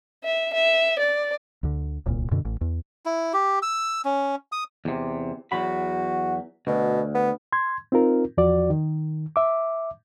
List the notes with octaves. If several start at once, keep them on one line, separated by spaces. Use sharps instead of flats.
E5
E5
D5
D2 D3
D1 C2 A#2
F#2 B2 D3
A1
E2
E4
G4
E6
C#4
D#6
E2 C3
E2 F#3 F#4 B5
D2 B2
B3
C6 G#6
C4 D#4 F4 A#4
E2 F3 F#4 D5
D#3
E5 D6